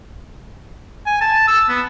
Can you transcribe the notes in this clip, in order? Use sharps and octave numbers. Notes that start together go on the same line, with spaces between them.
G#5
A5
E6
B3